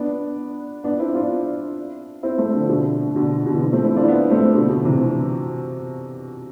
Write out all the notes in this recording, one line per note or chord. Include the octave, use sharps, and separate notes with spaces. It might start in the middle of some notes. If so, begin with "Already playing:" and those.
Already playing: B3 D4
B3 D4
C4 E4
D4 F4
C4 E4
A3 C4
D3 F3
B2 D3
B2 D3
B2 D3
E3
D3 F3
A3 C4
C4 E4
D4 F4
E4
B3 D4
A3 C4
B2 D3
B2 D3
C3 E3